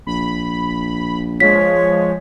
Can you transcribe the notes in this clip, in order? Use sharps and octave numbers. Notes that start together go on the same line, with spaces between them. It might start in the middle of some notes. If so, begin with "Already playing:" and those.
A#1 B5
F3 G#3 C#5 B6